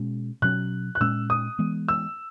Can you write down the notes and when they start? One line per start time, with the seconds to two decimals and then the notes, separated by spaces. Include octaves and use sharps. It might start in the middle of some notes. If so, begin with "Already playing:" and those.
Already playing: B2 G#3 C#4
0.42 B2 F#3 C#4 F#6
0.95 F#6
1.01 A#2 G#3 C#4 E6
1.30 D#6
1.59 E3 G#3 B3
1.88 E6